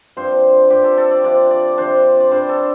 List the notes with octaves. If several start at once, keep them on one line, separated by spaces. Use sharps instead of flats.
G2 F3 C4 C5
G2 F3 C4 G4
A4
A4
D5
C3 F3 D4 D5
D5
C3 F3 D4 C5
D5
G2 G3 D4 C5
A4